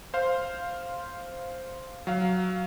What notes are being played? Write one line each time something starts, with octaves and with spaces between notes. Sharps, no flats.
C5 F5
F#3 F5